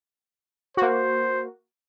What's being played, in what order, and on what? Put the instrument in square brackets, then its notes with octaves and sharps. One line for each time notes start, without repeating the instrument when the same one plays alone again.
[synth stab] A#3 F#4 [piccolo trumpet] C5